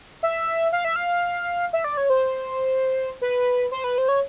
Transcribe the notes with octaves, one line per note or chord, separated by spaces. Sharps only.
E5
F5
E5
F5
E5
D5
C#5
C5
B4
C5
B4
C5
C#5